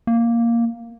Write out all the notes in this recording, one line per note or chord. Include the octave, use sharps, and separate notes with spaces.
A#3